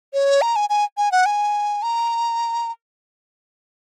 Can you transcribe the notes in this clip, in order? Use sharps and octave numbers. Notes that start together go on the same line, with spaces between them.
C#5
A#5
G#5
G#5
G#5
F#5
G#5
A#5